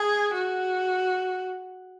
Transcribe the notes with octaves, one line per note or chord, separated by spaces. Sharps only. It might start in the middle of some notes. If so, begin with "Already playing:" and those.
Already playing: G#4
F#4